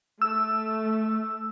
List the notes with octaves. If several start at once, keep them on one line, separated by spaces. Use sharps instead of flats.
A3 E6